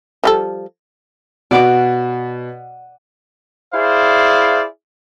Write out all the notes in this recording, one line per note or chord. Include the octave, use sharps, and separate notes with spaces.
F3 G3 A4
B2 D5 F#5 D6
E4 G#4 C5 D5 F5